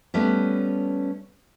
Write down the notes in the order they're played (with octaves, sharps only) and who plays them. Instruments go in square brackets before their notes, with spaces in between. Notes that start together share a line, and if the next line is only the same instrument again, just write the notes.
[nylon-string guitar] G3 A3 B3 C#4